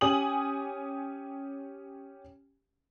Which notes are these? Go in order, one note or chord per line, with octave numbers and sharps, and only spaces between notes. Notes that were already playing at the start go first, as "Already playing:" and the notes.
C#4 G4 G#5 D#6 F#7